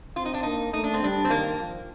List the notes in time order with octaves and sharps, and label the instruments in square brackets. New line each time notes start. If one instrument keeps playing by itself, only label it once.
[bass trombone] C4 [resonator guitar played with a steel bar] F4
[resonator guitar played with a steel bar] D#4
D4
[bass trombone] A#3 [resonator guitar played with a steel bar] D#4
[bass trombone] A3 [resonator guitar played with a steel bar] D#4
[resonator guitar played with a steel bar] D4
C4
[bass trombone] G3 [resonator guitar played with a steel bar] D4
[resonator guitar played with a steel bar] C4
[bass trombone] D#3 [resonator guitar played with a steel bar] A#3
[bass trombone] F3